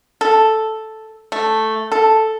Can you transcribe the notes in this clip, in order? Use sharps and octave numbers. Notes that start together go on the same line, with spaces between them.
A4
A3
A4